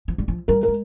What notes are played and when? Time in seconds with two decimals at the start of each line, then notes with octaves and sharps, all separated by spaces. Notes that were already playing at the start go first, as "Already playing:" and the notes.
0.08 F3
0.18 G3
0.28 F3
0.48 G3 A#4
0.63 A#4
0.68 G#3